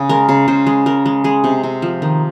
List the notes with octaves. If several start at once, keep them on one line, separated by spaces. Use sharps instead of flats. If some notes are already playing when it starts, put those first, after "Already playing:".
Already playing: C#3 G#4
G#3 A#4
C#3
C#3 C5
G#3
G#3 A#4
G#3
G#3 G#4
C3
C3
F3
D#3